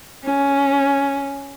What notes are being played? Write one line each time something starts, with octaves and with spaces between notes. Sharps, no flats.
C#4